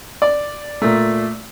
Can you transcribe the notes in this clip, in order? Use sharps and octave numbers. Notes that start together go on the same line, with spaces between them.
D5
A#2 A3